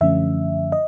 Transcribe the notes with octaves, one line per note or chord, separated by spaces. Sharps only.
F#2 D3 F3 A3 C#4 E5
D#5